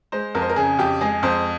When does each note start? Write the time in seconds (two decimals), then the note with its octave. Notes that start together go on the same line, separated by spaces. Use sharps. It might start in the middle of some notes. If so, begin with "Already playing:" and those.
0.12 G#3 C5
0.35 F2 A#4
0.42 C5
0.49 A#4
0.56 C#3 G#4
0.79 F2 G4
1.01 G#3 G#4
1.23 F2 C5